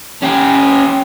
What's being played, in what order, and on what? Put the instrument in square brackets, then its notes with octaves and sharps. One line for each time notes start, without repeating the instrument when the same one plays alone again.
[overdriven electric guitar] C#4 G4